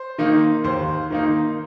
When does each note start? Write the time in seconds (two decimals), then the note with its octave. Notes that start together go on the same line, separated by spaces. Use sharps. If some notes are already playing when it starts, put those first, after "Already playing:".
Already playing: C5
0.18 D#3 A#3 D#4
0.64 D#2 C5
1.10 D#3 A#3 D#4